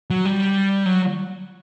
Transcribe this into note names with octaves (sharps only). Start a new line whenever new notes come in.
F#3
G3
F#3